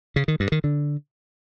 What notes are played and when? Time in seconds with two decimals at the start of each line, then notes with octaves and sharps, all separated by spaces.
0.16 C#3
0.28 D#3
0.40 G2
0.52 D#3
0.64 D3